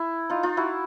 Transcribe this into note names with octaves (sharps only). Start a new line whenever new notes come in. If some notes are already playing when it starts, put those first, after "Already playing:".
Already playing: E4
D#4 F4
D#4 F4
E4 F#4